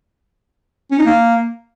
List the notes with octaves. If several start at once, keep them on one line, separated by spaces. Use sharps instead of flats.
C#4
D#4
A#3